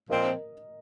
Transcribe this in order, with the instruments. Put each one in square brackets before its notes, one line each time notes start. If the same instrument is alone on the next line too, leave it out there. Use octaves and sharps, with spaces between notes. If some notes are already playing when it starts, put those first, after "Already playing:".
[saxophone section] A#2 F3 C4 [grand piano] A#4 D#5